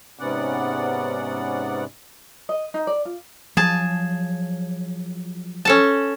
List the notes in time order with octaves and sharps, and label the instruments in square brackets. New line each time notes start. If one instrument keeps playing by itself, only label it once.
[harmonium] G#2 C3 B3 C#4 D5 F#5
[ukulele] D#5
D#4
D5
F4
[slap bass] F3 F#3 [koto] G#4 A5
[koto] C#4 A4 A5